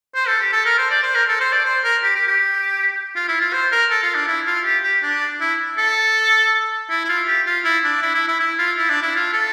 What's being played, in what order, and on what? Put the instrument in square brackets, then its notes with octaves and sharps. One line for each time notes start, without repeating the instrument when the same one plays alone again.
[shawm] C5
A4
G4
A4
A#4
C5
D5
C5
A#4
A4
C5
D5
C5
A#4
G4
G4
G4
F4
E4
F4
C5
A#4
A4
F4
D4
E4
F4
G4
G4
D4
E4
A4
E4
E4
F4
G4
F4
E4
D4
E4
E4
E4
E4
F4
E4
D4
E4
F4
A4